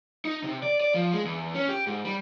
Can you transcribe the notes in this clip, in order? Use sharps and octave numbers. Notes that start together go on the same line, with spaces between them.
D#4
C3
D5
D5
F3
G#3
E2
C#4
G4
G#2
G3